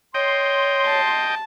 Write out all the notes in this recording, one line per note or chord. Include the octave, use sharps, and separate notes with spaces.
C#5 D#5 G5 C6
A5